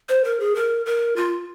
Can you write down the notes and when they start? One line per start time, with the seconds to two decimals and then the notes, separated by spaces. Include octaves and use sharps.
0.09 C5
0.24 A#4
0.40 G#4
0.55 A#4
0.86 A#4
1.16 F4